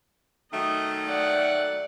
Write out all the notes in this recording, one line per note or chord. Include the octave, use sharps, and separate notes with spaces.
D#3 F#3 A3 D#5
D5 F#5